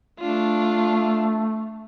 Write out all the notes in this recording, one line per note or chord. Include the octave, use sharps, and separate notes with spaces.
A3 D4 F4